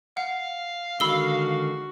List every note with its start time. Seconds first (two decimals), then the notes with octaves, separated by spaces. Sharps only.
0.17 F5 F#5
1.00 D3 D#3 G#3 F#4 B5 E6 G7